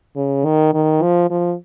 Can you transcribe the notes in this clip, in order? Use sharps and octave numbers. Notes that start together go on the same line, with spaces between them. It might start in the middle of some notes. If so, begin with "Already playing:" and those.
C#3
D#3
D#3
F3
F3